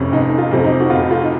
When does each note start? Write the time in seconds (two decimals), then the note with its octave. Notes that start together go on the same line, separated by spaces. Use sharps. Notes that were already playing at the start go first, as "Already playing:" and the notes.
Already playing: F1 F2 C3 F3 C#4
0.12 F1 D#4
0.38 F4
0.51 F2 C3 F3
0.64 D#4
0.80 F#4
0.90 F1 F4
1.11 F4
1.24 D#4